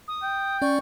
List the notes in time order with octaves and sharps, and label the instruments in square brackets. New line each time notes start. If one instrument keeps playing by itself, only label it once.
[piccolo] D#6
[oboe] G5
[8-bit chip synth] C#4 D5 [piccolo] C#6